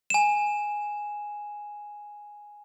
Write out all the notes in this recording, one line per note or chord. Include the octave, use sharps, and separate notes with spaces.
G#5 E7